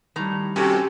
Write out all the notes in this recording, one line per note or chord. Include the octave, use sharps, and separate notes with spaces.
A2 D#3 G3 A#5
C3 C#4 F#4 G4 A4